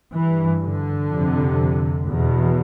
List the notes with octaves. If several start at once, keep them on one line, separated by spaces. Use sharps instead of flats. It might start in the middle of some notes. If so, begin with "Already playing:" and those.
G2 E3
D3
F2 C3
E2 B2